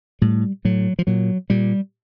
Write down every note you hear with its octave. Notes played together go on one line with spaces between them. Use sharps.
A2 G3
A2 F#3
F3
A#2 F#3
A#2 G3